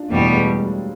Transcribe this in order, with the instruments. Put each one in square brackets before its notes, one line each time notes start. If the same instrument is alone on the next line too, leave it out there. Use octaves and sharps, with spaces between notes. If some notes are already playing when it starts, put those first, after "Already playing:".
Already playing: [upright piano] D4 D#4 F4
[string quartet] E2 B2 G3 B3 [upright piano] A3
[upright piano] G#3
G3
F#3